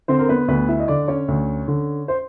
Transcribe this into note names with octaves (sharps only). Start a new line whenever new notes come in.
D3 C4 C5
A#4
B3 B4
D2 B3 B4
E4 E5
D#5
D3 D4 D5
C#4 C#5
D2
D3
C5